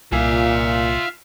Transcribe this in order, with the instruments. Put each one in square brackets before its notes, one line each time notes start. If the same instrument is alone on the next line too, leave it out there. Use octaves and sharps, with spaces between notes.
[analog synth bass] C2 [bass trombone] A#2 [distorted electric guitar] F4 G#5 [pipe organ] E5 F5